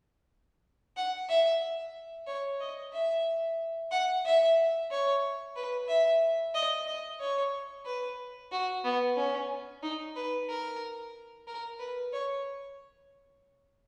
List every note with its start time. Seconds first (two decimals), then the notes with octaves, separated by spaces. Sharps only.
0.97 F#5
1.29 E5
2.27 C#5
2.61 D#5
2.93 E5
3.91 F#5
4.25 E5
4.91 C#5
5.56 B4
5.88 E5
6.55 D#5
6.87 D#5
7.20 C#5
7.86 B4
8.52 F#4
8.84 B3
9.17 C#4
9.83 D#4
10.16 B4
10.49 A#4
11.47 A#4
11.79 B4
12.13 C#5